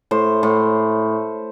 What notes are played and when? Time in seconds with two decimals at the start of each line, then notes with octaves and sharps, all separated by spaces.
0.11 A2 C5
0.43 A2